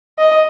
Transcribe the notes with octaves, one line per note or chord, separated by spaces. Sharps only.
D#5